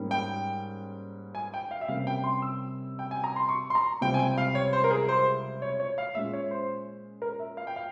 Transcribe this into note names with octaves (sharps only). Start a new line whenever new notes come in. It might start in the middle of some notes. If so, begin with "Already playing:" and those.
Already playing: G#2 G3 A#3 C#4
G5
G#5
G5
F5
E5
C3 G3 A#3 C#4 F5
G5
C6
E6
G5
G#5
A#5
C6
C#6
C6
A#5
C#2 C3 G3 C4 G5
G#5
G5
F5
C#5
C5
A#4
G#4
C5
C#5
C#5
F5
A#2 G#3 C#4 E5
C#5
C5
A#4
E5
F5
G5
F5